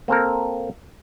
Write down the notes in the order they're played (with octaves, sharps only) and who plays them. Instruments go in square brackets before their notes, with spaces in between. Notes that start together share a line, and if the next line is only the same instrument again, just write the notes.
[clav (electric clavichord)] A#3 C4 A4 A#4